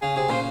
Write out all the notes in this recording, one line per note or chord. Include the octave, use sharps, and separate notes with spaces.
C#3 G#4
C3 G#4
A#2 C#3 C5